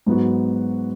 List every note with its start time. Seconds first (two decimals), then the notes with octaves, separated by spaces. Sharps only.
0.06 G#2 F#3 B3 F#4